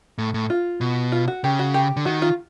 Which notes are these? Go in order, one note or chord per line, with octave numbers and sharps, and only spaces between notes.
A2
A2
F4
B2
F4
F#4
C#3 G4
F#4
G4
D3
D#3 F#4
F4